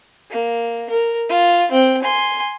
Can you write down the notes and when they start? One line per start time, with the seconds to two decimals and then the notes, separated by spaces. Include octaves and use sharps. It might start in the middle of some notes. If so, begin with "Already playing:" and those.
0.31 A#3
0.90 A#4
1.29 F4
1.72 C4 G5
2.02 G#5 C6